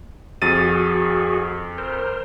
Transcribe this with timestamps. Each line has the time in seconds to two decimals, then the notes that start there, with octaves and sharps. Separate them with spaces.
0.42 F2 F#4 G#4 A6 D#7
1.78 A#4 C5